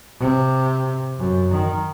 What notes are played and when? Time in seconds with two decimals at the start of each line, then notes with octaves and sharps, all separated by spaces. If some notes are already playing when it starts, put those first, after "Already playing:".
0.20 C3
1.19 F#2
1.52 D#3